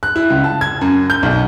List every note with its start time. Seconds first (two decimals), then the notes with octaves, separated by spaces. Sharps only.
0.03 F#6
0.16 E4
0.30 C#2
0.44 A5
0.61 G#6
0.81 F#2
1.10 G6
1.23 B1